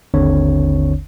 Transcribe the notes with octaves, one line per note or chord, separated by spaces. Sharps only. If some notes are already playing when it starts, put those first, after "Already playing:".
G#1 D#2 D3 C4 D4 C#5